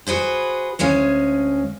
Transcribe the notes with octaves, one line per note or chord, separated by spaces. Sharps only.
F#4 G#4 B4 C5
D2 G#3 C#4 F5